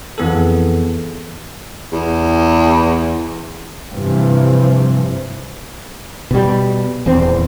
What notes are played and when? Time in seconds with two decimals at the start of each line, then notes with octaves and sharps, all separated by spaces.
0.18 F2 E3 B3 G#4 A4
1.92 E2
3.93 G2 C3 E3 F3
6.31 B2 G3
7.06 D#1 E2 C4